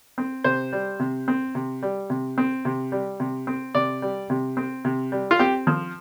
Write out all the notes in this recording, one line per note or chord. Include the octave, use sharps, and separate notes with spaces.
C4
C3 C5
G3
C3
C4
C3
G3
C3
C4
C3
G3
C3
C4
C3 D5
G3
C3
C4
C3
G3
F4
C4 G4
F3